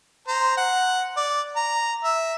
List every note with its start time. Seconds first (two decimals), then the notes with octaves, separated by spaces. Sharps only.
0.27 C5 A#5
0.57 F#5
1.17 D5
1.56 A#5
2.04 E5